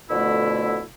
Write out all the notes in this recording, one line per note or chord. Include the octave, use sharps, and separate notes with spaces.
F2 B2 D3 A3 E4